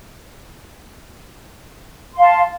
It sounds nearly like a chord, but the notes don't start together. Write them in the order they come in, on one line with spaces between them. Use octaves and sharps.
C6 F5 A5